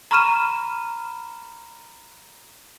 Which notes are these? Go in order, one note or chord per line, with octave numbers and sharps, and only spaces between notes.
A#5 B5 C#6 F6 D#7 E7